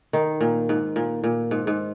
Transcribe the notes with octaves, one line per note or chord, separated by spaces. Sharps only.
D#3
A#2
G#2
A#2
A#2
G#2
G#2